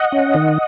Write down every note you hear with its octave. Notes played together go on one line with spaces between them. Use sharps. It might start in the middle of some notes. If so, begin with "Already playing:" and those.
Already playing: D#5 F#5
C#4
D#3